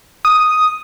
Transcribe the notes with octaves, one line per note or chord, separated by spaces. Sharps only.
D#6